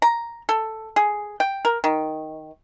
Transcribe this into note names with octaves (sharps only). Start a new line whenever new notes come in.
A#5
A4
G#4
G5
A#4
D#3